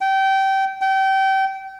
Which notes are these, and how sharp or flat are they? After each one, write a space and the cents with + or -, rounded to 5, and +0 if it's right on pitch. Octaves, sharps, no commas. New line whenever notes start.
G5 -25
G5 -30